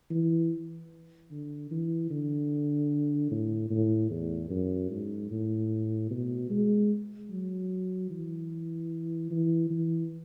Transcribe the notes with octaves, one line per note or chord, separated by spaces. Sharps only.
E3
D3
E3
D3
A2
A2
E2
F#2
G#2
A2
B2
G#3
F#3
E3
E3
E3